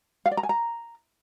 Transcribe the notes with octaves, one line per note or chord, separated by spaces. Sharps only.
F5
D5
A#5
G#5
A#5